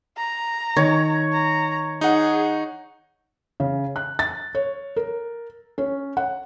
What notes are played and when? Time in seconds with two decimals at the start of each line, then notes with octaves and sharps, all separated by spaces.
0.17 A#5
0.76 D#3 C#5
1.32 A#5
2.01 D#4 G#4 F#5
3.60 C#3
3.96 F#6
4.19 A6
4.55 C#5
4.96 A#4
5.78 C#4
6.17 F#5